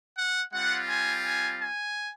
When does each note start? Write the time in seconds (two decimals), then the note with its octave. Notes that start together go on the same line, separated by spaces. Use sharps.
0.17 F#5
0.53 G3 C4 F4 F#5
0.89 G#5
1.25 G#5
1.62 G#5